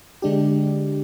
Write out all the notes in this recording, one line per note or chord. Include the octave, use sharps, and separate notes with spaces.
D3 G#3 D4 G4